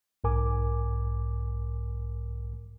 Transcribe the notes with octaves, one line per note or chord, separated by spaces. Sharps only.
B1 G#2 A#4 G#5 D6